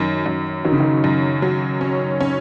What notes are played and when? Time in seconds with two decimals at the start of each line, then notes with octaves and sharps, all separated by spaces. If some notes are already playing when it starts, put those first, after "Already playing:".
Already playing: F#2 D#3
0.26 F#2
0.65 D#3 F#3
0.72 C#3
0.80 D#3
1.04 F#2
1.42 F#3
1.81 C#4
2.20 C#4